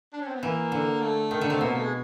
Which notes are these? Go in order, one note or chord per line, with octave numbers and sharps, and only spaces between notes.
D4
C#4
C4
B3
E3 A#3
D3
A3
D#3
D3
C3 A3
B2 A#3
A3
G#3